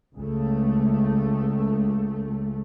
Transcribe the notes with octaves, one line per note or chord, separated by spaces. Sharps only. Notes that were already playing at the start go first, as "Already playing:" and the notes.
C#2 A3